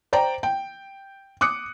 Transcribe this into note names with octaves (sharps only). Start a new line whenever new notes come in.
C5 D5 G5 A#5
G5
D6 D#6 F#6 C#7